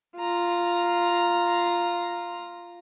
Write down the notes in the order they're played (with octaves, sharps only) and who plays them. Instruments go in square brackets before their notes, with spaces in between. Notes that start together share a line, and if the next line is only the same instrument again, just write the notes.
[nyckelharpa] F4 A#5